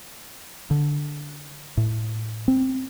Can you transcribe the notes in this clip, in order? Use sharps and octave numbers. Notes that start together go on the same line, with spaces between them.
D3
A2
C4